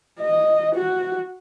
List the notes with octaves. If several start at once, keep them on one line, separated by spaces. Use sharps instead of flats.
D#5
F#4